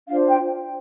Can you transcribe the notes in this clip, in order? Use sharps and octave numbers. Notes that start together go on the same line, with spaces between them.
D4 F4 C5 F5
G5